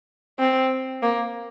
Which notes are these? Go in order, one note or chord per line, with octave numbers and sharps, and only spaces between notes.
C4
A#3